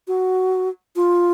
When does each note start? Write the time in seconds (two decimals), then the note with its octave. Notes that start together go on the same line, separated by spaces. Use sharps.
0.08 F#4
0.96 F4